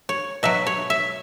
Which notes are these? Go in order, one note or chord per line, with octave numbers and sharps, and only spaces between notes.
C#5
B2 F#3 E5
C#5
E5